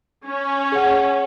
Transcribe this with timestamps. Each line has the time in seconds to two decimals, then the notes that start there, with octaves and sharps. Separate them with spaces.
0.26 C#4
0.72 G#4 C#5 F#5